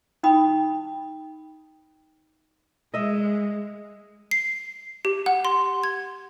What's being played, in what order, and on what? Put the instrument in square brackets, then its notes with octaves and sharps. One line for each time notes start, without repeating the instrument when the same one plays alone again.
[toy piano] D#4 G5 B5 D#6
[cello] G#3 [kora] D#5 E5
[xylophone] C7
G4
F#5
C6
G#6